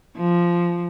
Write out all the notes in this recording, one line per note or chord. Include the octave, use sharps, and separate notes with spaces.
F3